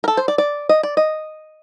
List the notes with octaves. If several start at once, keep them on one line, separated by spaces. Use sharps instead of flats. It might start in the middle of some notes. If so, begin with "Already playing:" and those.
A#4
A4
C5
D5
D5
D#5
D5
D#5